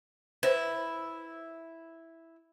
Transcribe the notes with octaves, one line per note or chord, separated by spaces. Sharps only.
E4 B4 C5